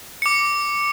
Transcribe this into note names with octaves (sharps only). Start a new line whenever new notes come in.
D6 C#7